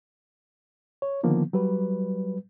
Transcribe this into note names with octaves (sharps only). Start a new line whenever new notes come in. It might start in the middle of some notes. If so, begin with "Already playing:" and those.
C#5
D3 D#3 F3 A#3 B3
F#3 G3 B4